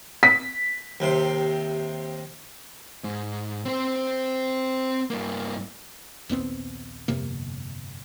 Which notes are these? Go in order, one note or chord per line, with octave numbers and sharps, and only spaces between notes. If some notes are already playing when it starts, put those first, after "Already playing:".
B6
D#2 C3 C6
G#2
C4 C5
G2 A#3
A#1 D#2 B3 C4
G1 F2 C3 A#3